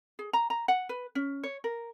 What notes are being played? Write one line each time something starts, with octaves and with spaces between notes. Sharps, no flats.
G#4
A#5
A#5
F#5
B4
C#4
C#5
A#4